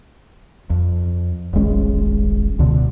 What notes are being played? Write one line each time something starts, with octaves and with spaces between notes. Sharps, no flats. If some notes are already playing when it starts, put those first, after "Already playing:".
F2
D#1 A1 G#3 C#4
C#2 B2 D3